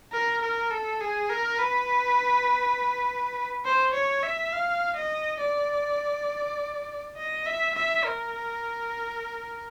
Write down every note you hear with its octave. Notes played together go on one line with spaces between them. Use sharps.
A#4
A#4
A4
G#4
A#4
B4
C5
C#5
E5
F5
D#5
D5
D#5
E5
E5
A#4